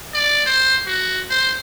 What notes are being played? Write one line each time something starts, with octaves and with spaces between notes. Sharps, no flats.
D5
C5
F#4
C5